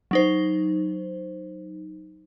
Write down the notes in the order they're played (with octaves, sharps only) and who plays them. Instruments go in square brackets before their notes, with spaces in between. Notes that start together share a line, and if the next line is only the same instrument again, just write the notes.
[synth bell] F#3 D#4 C5